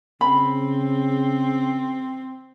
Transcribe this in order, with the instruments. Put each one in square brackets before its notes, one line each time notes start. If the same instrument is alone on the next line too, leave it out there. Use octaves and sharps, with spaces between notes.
[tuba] C#3 [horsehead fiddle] C4 [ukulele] B5